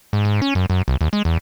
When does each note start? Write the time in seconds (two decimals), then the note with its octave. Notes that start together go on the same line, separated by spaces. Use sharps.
0.13 G#2
0.25 G#2
0.42 C#4
0.55 F#2
0.70 F#2
0.88 C2
1.01 D#2
1.13 G#3
1.25 E2